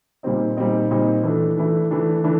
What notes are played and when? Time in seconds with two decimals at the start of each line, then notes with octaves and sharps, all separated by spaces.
0.23 A#2 G3 C4 D#4
0.57 A#2 G3 C4 D#4
0.91 A#2 G3 C4 D#4
1.23 E3 A3 D4
1.57 E3 A3 D4
1.91 E3 A3 D4
2.24 E3 A3 D4